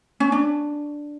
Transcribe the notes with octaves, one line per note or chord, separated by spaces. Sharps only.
C#4
D4